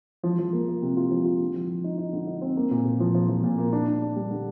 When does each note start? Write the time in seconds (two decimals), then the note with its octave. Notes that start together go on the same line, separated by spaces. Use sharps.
0.23 F3
0.39 F3
0.53 A#3
0.68 A#3
0.82 C3
0.97 F4
1.11 F3
1.25 F4
1.40 D3
1.55 F3
1.69 F3
1.84 D#4
1.98 D#4
2.13 D3
2.27 D#4
2.41 C4
2.57 A#3
2.71 A#2
2.85 A#2
3.00 F3
3.15 F3
3.29 F3
3.44 A#2
3.58 A#3
3.73 D4
3.87 D4
4.02 D4
4.16 G3
4.31 D3